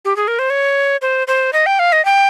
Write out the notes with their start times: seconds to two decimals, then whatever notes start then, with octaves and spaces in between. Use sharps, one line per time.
0.05 G4
0.16 G#4
0.28 A#4
0.39 C5
0.50 C#5
1.02 C5
1.27 C5
1.53 D#5
1.66 G5
1.79 F5
1.92 D#5
2.05 G5